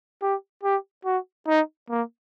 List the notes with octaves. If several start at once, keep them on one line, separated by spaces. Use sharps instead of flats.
G4
G4
F#4
D#4
A#3